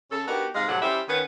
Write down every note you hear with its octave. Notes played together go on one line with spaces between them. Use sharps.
C#3 A4
B3 D4 D#4 F#4 G4 A#4
G#2 C3 G#3 F5
F2 A2 C3 F#3 A4 F#5
G3 C#4 E4 G4 C5 E5
D#3 B3 C#4